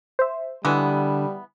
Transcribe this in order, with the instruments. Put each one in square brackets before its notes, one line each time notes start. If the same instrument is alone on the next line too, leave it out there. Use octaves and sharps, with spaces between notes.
[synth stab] C5 E5
[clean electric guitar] D3 [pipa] E3 G#3 B3 [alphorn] G3